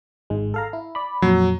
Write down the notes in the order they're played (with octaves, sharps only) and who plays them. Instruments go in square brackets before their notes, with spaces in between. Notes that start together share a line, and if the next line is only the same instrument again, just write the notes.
[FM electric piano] G#1 G#2 G#3
A4 F5 A#5
E4
D5 B5
[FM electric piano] F2 A#2 [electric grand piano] F#3